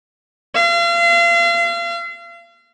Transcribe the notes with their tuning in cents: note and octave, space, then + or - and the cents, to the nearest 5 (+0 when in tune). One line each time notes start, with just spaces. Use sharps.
F5 -35